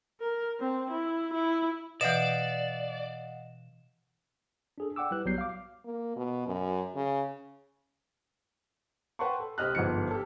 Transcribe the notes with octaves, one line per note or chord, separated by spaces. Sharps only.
A#4
C4
E4
E4
B2 E3 D5 D#5 F5 F#5 E7
D4 G#4 A4
D5 F#5 G5 D6 E6
G3 E4 B4 F#6
B1 F#3 G3 B3 G6 C7
F5 D6
A#3
B2
F#2
C#3
B4 F#5 G5 A5 C6 C#6
A4
C2 C4 G4 D#5 F6 F#6
G1 G#2 F3 C#7
G4 A4